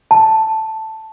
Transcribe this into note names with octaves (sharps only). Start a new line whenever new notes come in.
A5